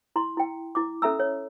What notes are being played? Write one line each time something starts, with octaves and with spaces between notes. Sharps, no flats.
E4 A#5 C6
E4 G5
E4 D6
C#4 A4 E5 A#5 E6
C#5